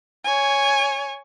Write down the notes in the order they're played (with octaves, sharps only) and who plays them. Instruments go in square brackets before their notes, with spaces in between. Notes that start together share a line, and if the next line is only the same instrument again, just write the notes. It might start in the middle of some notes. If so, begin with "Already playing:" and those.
[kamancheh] C#5 G#5